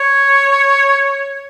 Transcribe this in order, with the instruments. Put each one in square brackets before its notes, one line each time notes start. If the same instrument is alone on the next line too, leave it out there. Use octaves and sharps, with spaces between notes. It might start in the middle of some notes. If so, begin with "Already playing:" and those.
Already playing: [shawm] C#5